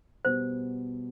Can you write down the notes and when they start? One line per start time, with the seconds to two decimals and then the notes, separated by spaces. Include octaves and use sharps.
0.25 B2 G3 B3 C5